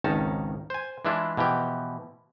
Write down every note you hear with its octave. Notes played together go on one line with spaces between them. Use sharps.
G#1 C#2 D#3 C#4 D#4 A5
C5 G#5
E3 G#3 D4 E4 F4
B2 E3 F3 G4